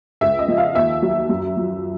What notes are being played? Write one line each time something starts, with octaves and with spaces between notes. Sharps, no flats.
C#2 E5
D#5
F3
F5
D#2 E5
F#3
F#2
F3